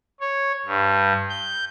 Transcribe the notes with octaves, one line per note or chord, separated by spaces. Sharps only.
C#5
G2
G6